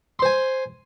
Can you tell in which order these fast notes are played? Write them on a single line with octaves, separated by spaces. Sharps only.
C6 C5 G#5